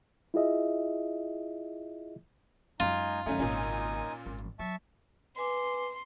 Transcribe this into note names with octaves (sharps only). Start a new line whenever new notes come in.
E4 F4 G#4 D#5 E5
F#2 G#3 D#4 F4 G#5
F#2 D#3 A3 C#4 D#4 G#5 D#6
G#1 A#2 C#3 C#4
G#1
F#3 E5 A5 C#6
B4 G#5 C6 D6